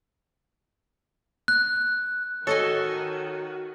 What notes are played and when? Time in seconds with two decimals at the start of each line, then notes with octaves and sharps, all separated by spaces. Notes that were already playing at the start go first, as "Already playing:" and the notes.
1.48 F#6
2.47 D#3 F#4 A4 C#5 D#5 G#5